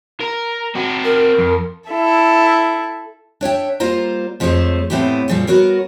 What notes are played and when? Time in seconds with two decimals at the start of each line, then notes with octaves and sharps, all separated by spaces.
0.21 A#4
0.75 C4 F#4
1.04 A#4
1.38 F2
1.90 E4 A4
3.41 D4 C#5 E5 G5
3.80 G3 A#3 F4 C5 A#5
4.40 F2 F3 G#3 A3 C5 C#5
4.90 A2 A3 B3 C4 E4 G4
5.28 F#2 A#2 C#3 F3 G3
5.47 B3 F#4 A#4 C#5